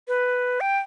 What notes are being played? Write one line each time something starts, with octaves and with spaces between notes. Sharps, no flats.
B4
G5